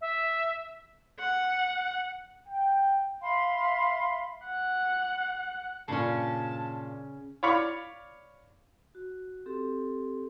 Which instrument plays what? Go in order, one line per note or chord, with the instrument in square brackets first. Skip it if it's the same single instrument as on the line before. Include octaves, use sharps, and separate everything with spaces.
[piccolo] E5
[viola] F#5
[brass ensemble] G5
[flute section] E5 F5 B5 C6
[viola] F#5
[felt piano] G2 A#2 [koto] C#3 C#4 [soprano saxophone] A5
[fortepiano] C#5 D5 F5 B5 C#6 D6
[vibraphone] F#4
C4 G4 A4